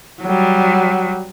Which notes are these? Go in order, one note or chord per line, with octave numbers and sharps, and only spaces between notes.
F#3 G3